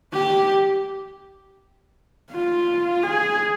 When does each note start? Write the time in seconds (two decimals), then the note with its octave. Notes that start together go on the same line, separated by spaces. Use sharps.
0.14 G4
2.31 F4
3.03 G#4